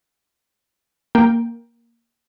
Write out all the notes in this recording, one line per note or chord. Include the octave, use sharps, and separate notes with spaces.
A#3 A#4 G5